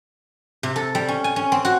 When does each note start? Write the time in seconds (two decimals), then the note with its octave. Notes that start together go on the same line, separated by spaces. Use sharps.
0.63 C3
0.76 A4
0.95 G3
1.08 C#4
1.24 G#5
1.36 C#4
1.52 C4
1.65 F#4